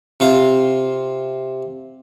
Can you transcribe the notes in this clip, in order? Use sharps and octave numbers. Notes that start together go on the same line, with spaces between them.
C3 F4 C5